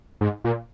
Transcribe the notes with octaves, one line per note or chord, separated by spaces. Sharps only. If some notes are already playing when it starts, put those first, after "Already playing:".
G#2
A#2